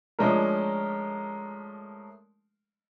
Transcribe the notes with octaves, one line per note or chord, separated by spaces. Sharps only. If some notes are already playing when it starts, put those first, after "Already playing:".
F3 G#3 A3 C#4 D4 A#4